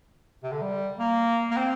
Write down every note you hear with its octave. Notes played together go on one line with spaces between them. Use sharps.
C3
D3
G3
A#3
A#3
C4